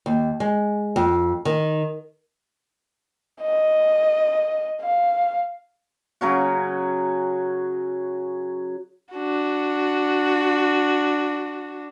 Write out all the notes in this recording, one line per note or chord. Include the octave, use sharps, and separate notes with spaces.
D#2
G#3
F2
D#3
D#5
F5
C#3 F#3 C#4 F#4
D4 F#4